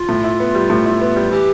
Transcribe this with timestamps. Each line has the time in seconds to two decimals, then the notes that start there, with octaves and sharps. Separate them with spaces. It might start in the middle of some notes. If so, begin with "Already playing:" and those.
Already playing: F4
0.09 A2
0.24 E4
0.40 B3
0.55 G3
0.70 A2
0.86 E4
1.01 B3
1.16 G3
1.32 E3 G4